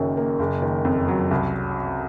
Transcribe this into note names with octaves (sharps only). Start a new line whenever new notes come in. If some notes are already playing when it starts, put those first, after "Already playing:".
Already playing: F#1 F#2 D#3
A#3
F#1
D#3
F2
F#3
C2